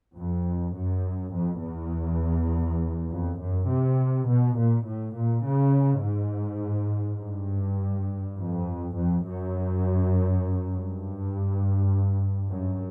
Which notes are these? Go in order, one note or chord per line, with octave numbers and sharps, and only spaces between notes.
F2
F#2
F2
E2
F2
F#2
C3
B2
A#2
A2
A#2
C#3
G#2
G2
F2
F2
F#2
G2
F#2